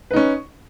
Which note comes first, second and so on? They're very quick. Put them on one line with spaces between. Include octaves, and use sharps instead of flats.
B4 D#4 C#4